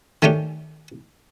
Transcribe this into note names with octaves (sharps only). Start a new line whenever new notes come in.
D#3 A3 C#4 D4 G4